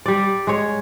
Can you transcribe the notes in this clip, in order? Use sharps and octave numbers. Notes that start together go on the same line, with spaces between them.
G3 D5
G#3 C#5